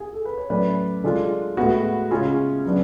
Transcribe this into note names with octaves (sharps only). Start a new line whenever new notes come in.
G#4
A4
B4
C#5
A2 F#3 C#4 B4 D5
D3 G#3 D4 F4
A2 G#3 B3 F#4
C#3 G#3 C#4 F4
C#3 F#3 B3 D4